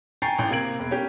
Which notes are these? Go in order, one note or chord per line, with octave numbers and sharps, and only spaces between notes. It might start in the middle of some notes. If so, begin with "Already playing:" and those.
G5 G#5 A#5 C#6 A6 C7
A1 G5
C3 A#3 A#5 G#6 D7 F#7
E1
C#4 G4